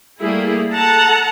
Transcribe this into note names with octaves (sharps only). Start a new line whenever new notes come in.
G3 A3 A#3 E4 G#4
A4 F#5 A5 A#5